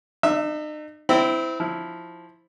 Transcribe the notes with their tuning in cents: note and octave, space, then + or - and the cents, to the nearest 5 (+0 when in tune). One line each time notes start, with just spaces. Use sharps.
D#4 -40 E5 +0 E6 +0
C4 -20 E4 -5
F3 +5 E4 +0